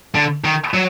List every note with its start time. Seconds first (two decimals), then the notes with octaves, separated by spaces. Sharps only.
0.15 D3
0.44 D#3
0.74 F#3